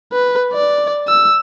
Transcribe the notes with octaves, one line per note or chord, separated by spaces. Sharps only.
B4
D5
E6